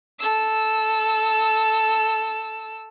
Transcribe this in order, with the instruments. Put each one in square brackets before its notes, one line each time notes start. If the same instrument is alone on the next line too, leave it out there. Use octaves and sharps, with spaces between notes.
[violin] A4 E6